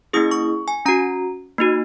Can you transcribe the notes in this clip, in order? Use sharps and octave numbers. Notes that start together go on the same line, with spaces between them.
A#3 C#4 E4 G#4 D#6
C#6
G#5
C#4 F#4 A#5
A#3 D#4 F#4